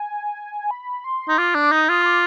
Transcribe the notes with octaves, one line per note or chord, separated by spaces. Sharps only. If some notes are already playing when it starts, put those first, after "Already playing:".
Already playing: G#5
B5
C6
D#4
F4 D6
D4
D#4 D#6
F4
C6
D6